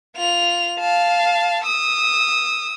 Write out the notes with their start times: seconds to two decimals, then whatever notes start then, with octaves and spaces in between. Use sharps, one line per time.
0.17 F4 F7
0.79 F5 A5
1.66 D#6 E6